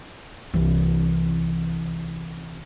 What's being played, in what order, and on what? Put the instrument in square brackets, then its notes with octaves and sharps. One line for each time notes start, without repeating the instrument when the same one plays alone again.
[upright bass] C2 E3